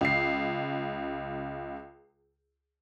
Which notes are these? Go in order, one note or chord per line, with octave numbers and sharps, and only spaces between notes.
C#2 C7